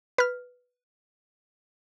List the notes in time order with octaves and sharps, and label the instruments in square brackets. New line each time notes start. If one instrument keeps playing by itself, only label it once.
[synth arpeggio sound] B4 F6